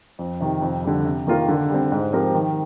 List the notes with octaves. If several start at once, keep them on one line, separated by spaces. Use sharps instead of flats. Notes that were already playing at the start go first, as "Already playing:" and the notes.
F2
C3 D#3
F2
D3 G3
C3
D#3 A#3 F4 A#4
D3
G3 C4
G#2
F3 C4 G4 A#4
D#3